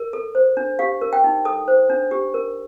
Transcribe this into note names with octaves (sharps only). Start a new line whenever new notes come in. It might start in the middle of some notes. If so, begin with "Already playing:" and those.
Already playing: A#4
A4
C5
D4
G4 F5
A#4
G5
D#4
A4 D#6
C5
D4
G4
A#4